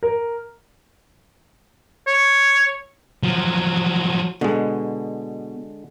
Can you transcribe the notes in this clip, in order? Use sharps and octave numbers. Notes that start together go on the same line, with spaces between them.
A#4
C#5
F3 F#3
B2 D3 G#3